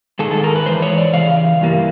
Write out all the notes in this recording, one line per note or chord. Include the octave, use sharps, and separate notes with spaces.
G#2 D#3 G#3 A4
A4
A#4
B4
G#2 E3 C5
C#5
D5
C#3 E3 F5
G2 E3 G3 A#3